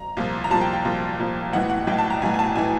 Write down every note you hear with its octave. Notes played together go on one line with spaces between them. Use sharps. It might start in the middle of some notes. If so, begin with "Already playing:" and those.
Already playing: A#5
C2 A#2 F3
A#5
C2 A#2 F3 A5
G5
G5
C2 A#2 F3
C2 A#2 F3
B1 A2 E3 F#5
F#5
B1 A2 E3 G5
A5
A#5
B1 A2 E3 G#5
G#5
A5
A2 E3 G#5